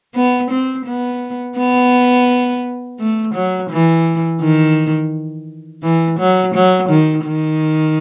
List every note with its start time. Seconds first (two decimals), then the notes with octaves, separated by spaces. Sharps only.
0.15 B3
0.51 C4
0.86 B3
1.57 B3
3.00 A3
3.35 F#3
3.70 E3
4.41 D#3
5.83 E3
6.19 F#3
6.55 F#3
6.89 D#3
7.25 D#3